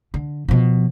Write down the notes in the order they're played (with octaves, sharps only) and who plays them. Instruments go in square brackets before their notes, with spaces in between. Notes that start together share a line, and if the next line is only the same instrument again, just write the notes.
[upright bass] D3
B2 F3